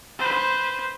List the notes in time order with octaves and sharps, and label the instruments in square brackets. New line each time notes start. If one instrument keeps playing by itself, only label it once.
[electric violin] B4 C5